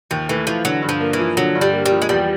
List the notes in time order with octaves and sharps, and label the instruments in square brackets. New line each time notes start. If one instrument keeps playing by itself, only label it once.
[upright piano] D#2 [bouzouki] F3
[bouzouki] E3 [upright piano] A3
[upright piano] E3 [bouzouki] F3
[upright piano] D3 [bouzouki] F#3
[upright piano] G2
[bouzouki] F3
[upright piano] A#3
[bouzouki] E3
[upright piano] F3
[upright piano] D3 [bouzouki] F#3
[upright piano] G2
[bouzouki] G3
[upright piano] A#3
[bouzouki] G3
[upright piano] F3
[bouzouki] G#3
[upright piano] E2 [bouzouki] G3